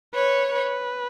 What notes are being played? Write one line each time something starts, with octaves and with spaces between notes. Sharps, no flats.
B4 C#5
B4